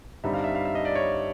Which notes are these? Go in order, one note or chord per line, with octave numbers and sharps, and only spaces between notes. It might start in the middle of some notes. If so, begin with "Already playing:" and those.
G2 D3 G3 C4 D#4 E5
F5
E5
F5
E5
D#5
D5
C#5